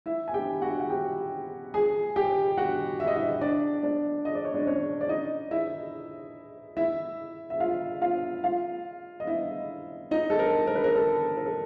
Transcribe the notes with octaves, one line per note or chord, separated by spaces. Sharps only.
E4 E5
G#5
G4 G5
F#4 F#5
F#5
G4 G5
G#4 G#5
G4 G5
F#4 F#5
E5
D#5
E4 E5
D4 D5
D4 D5
D#5
D5
C#5
D4 D5
C#4 C#5
D5
D#4 D#5
E4 E5
E4 E5
E5
F4 F5
F4 F5
F4 F5
D#5
E4 E5
D#4 D#5
A4
A#4
A#4
B4
A#4
A4
A#4
A4